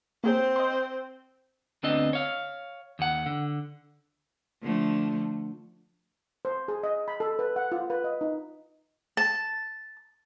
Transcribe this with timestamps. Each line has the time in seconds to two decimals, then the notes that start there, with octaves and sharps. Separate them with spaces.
0.24 A#3 C4 G#4 C5 C#5
0.56 D#5 G5 C6
1.83 D2 B3 C4 D4 D#5
2.13 C#5 F5
2.99 D#2 F#5
3.26 D3
4.61 D3 F3 A3
6.45 C5
6.68 G#4
6.83 D#5
7.08 B5
7.20 A4
7.39 B4
7.56 F#5
7.72 F4
7.90 B4
8.04 D#5
8.21 D#4
9.17 A5